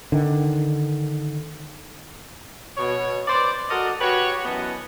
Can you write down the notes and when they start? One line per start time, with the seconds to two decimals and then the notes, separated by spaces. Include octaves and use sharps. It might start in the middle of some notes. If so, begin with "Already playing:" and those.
0.12 D3 D#3
2.77 B2 C#5
3.27 B4 C5 D5
3.69 F#4 A4 A#4 D5 D#5
4.00 F#4 G4 B4 C#5
4.45 F#2 E3 B3 D#5 A5